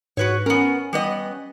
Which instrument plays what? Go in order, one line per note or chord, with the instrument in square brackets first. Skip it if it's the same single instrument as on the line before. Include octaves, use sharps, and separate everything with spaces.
[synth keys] G#2 [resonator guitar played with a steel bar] F#4 B4 C#5
[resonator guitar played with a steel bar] B3 A#4 [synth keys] C#4
[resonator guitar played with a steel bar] G3 B3 D#5